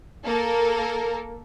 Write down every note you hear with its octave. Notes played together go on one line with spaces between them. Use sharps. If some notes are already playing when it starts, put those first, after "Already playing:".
A#3 A4 A#4